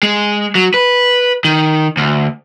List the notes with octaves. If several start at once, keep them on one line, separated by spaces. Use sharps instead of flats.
G#3
F#3
B4
D#3
D2